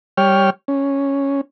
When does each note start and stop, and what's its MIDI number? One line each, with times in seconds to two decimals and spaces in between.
0.17 0.50 55
0.17 0.50 73
0.17 0.50 79
0.17 0.50 89
0.68 1.41 61